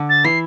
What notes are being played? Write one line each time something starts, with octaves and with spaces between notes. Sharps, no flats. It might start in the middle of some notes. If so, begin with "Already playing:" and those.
Already playing: D3
A6
E3 C7